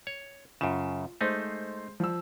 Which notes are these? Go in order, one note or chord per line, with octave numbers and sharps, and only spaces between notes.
C#5
F#2 C#3 F4 E7
G#3 A3 D#4 C5
F3 E6